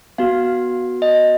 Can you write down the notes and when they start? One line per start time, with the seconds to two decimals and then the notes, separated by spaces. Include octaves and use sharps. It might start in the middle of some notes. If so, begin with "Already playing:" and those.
0.18 B3 F#4 F5
1.02 D#5